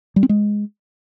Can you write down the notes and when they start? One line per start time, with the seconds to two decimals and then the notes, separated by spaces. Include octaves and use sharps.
0.16 G3
0.23 C4
0.29 G#3